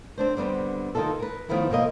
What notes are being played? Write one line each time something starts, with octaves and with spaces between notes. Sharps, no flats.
C4 D4 C5
D3 G3 B3 C4
D#3 A#3 D#4 F4 A4
A#4 B4
D#3 F3 A3 B3 E4
B2 F3 A#3 D#5